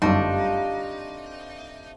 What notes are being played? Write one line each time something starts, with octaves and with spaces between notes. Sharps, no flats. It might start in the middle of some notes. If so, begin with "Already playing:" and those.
G1 F#2 C3 G3 A3 D4 D#4 F4